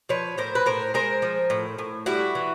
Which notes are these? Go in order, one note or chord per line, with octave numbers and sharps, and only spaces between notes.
F3 B4 C#5
A2 A#4 C5
B4
A2 A#4 C5
G#3 A#4 C5
F3
A2
A2
G3 E4 F#4
E3